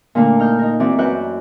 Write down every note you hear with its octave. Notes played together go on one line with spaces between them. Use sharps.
A#2 D3 A3 A#3 D4
D#4 F6 G6
D#4 A#4
E3 C4 F#4 D5
F#2 F#4 B4 D5 G5 F#6